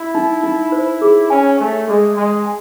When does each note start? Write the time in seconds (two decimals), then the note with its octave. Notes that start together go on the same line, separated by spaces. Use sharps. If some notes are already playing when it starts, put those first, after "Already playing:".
Already playing: E4
0.15 D#4
0.43 D#4
0.72 C5
1.01 G#4
1.30 C#4 G#5
1.59 A3 C#5
1.88 G#3 G#4
2.17 G#3 C6
2.46 G#5